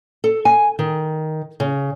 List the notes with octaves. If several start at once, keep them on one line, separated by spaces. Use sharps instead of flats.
A4
G#5
D#3
C#3